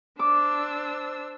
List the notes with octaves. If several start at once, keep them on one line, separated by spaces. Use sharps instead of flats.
D4 C5 D6 E6